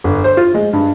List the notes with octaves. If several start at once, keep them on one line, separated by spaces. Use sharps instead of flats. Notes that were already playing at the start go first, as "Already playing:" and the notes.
G1
C5
F4
G#3
G2